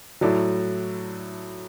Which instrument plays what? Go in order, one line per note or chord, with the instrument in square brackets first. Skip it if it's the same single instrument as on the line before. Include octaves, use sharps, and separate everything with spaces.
[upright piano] A2 A3 E4 A4 D5 [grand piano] F#3